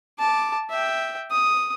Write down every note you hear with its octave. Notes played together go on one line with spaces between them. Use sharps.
A5 D6
E5 G5
D#6